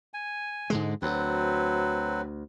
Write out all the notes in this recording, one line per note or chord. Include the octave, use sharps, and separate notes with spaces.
G#5
G#2 D3 G#3
D2 F#3 C4 B4